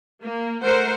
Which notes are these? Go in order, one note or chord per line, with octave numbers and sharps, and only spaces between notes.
A#3
A3 A#4 C5 F#5